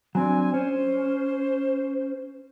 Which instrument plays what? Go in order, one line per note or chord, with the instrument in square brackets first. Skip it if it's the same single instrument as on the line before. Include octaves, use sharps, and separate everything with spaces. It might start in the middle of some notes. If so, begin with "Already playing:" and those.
[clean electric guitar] F#3 C4 D4 [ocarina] G#5
[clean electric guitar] C#4 [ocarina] C5